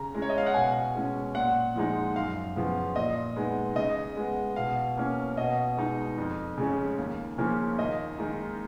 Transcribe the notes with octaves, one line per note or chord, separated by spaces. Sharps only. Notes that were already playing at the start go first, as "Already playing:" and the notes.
Already playing: C#3 A#5
G#3 C#4
C#5
D#5
F5
F#5
B2 G#5
G#3 C#4
A#2 F#5
F3 G#3 D#4
F#2 F5
C#3 F3 B3
A#2 D#5
G#3 B3 D#4
C#3 D#5
G#3 B3
B2 F5
A#3 C#4
B2 D#5
G#3 D#4
F2
C#3 G#3 C#4
D#2
C#3 F3 A#3 C#4
D#2 D#5
D#3 G#3 D#4